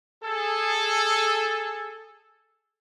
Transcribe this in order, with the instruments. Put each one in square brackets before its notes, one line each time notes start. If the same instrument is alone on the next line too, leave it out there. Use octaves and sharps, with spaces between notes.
[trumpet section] G#4 A4